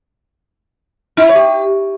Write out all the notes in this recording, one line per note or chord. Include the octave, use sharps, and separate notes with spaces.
D#4
E4
C#5
G4